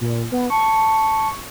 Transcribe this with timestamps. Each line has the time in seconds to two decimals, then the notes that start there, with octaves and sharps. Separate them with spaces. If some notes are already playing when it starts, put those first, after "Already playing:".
0.01 A#2
0.32 B3
0.50 A5 C#6